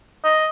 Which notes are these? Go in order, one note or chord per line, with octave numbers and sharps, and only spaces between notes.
D#5